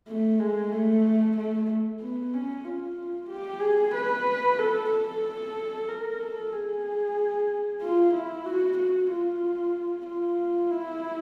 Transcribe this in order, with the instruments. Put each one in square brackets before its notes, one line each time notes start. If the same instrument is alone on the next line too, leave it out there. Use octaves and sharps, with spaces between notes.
[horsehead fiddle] A3
G#3
A3
A3
B3
C#4
F4
G4
G#4
B4
A4
A4
A#4
A4
G#4
F4
E4
F#4
F#4
F4
F4
E4